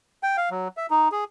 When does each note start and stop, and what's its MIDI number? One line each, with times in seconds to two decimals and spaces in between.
0.23 0.37 79
0.37 0.49 77
0.51 0.68 54
0.77 0.86 76
0.90 1.08 63
1.12 1.24 68